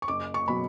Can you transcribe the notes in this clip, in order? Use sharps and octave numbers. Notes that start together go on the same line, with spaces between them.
C#6
F#1 D6
C#6
B2 F#3 B5